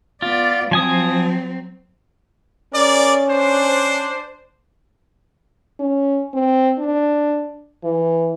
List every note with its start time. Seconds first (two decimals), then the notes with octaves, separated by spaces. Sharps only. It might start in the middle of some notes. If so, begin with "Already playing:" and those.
0.22 B3 F4 D5
0.71 F3 F#3 C4 G#5 D#6
2.74 C#4 G#4 A#4 D5
3.29 D4 C5
5.80 C#4
6.34 C4
6.79 D4
7.83 E3